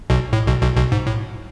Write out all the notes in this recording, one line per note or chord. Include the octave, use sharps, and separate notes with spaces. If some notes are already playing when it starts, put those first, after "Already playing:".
B1 B2
A2
B1 B2
B1 B2
B1 B2
G#2
A2